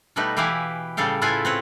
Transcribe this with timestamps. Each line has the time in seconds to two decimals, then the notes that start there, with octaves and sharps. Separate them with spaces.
0.16 B2 G3 A3 D#4 B4
0.37 E3 E4 G4 B4 F5 G#5
0.97 A2 C#3 G3 A4 F5 G5
1.21 A2 E4 F4 A4 B4 G#5
1.45 C4 B4 C#5